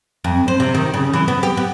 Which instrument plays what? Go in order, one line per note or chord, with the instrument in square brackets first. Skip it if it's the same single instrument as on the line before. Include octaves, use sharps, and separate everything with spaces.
[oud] F2
C5
C3
D#3
C#3
E3
B3
G4
B3